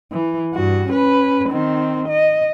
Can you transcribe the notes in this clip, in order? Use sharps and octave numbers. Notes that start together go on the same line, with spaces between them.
E3
G2 F#4
C#4 B4
D#3 C4
D#5